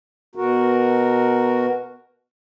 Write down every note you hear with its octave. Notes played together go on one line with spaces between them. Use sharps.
B2 F#4 A#4